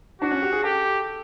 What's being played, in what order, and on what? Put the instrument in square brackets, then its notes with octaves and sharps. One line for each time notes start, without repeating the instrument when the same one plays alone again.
[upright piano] D4 [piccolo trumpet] F#4
[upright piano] C#4
G4
G#4
[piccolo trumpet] G4 [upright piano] A4